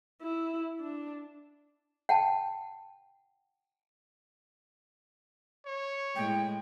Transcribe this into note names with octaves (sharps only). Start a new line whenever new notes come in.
E4
D4
F#5 G5 A5
C#5
A2 G#3 G5